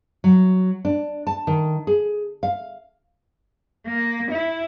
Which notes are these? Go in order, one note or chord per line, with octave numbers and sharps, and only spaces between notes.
F#3
D4
A5
D#3
G#4
F5
A#3
E4